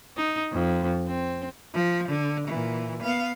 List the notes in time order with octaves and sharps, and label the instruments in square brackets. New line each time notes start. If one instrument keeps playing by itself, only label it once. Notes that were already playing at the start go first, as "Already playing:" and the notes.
[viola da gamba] D#4
F2
C4
[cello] F3
D3
A#2 E3
B3 F5